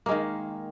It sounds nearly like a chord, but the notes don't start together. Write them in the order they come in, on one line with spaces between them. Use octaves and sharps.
A#3 G#3 D#3